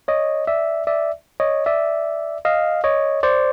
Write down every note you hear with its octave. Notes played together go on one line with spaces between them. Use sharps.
C#5 D#5
D5 E5
D5 E5
C#5 D#5
D5 E5
D#5 F5
C#5 D#5
C5 D5